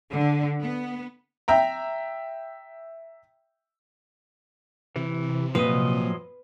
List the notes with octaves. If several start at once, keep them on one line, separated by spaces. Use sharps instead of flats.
D3
B3
E5 G5 A#5
C3 E3
A#2 F3 F#3 B4 D#5